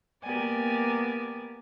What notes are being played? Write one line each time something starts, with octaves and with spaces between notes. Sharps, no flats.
A#3 B3 G4 A#4 D5 G#5